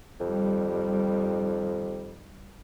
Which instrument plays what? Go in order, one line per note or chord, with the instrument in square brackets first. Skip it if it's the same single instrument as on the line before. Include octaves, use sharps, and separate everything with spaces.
[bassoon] F2 [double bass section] D#3 G3